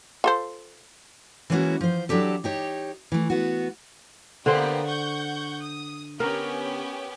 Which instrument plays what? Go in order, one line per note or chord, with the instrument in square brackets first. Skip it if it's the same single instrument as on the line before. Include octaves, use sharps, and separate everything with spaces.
[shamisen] F4 A4 C5
[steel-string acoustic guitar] E3 G#3 A#3 C#4 E4 F#4
F3 C5
F#3 D4 E4 G4 A4
D#4 G4 C#5
E3 A3
B3 F#4
[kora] D3 C5 [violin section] A#3 B3 G4
[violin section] F#5 C#6 G6
D#6
[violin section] B3 C#4 G4 [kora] A#4